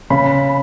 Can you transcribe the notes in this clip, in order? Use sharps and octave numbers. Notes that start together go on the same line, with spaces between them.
C#3 B5